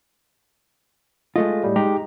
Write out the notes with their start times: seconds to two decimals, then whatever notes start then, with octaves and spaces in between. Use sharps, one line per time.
1.36 G#3 A3 F4 D#5
1.64 A2 G3
1.76 G#3 D#4 G4 A#5